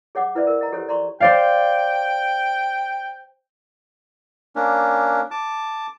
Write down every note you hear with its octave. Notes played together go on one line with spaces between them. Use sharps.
G#4 C#5 F#5 D6
E4 B4 C5 D5 E5
A#4
D#5 A#5
G4 A4 C5 C#5
D5 A#5 C6 C#6
C5 D5 F5 G5
A#3 C#4 D4
A5 D6